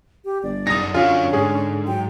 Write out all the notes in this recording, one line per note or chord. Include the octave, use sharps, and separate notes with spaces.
G4
G1 D5
F#2 D#4 D#6 A#6
F#2 D3 C#4 F4 F#4 G#5
G#2 G#4
F#3 G5